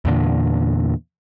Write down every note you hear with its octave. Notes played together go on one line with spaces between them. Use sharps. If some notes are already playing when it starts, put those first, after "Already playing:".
E2 A#2 D3